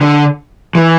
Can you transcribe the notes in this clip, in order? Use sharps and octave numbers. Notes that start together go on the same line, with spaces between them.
D3
E3